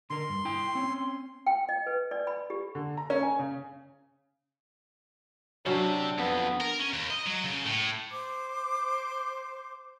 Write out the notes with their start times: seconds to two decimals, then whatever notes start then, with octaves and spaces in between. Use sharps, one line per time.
0.10 D3 A#4 C6
0.29 G2
0.45 E4 G5
0.75 C4 C#4
1.47 G5
1.69 D#5
1.86 B4
2.11 D5
2.27 B5
2.50 G4
2.75 D3
2.97 A#5
3.10 C#4
3.23 G#5
3.39 C#3
5.66 C3 F#3 C#4 D4 E4
6.18 F2 B3
6.61 A#4
6.80 C#4
6.93 D#2
7.11 D#5
7.27 F#3
7.44 C#3
7.65 A2
8.12 C5 D6